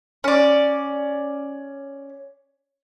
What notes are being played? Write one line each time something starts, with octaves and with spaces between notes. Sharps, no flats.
C#4 D5